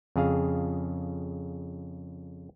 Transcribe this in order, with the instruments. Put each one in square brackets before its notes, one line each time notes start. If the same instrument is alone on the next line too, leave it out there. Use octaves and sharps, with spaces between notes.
[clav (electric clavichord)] F2 C#3 G#4 F5